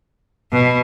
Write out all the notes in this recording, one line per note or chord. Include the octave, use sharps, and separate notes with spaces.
B2